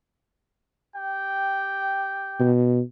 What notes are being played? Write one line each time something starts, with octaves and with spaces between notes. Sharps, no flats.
G4 G5
B2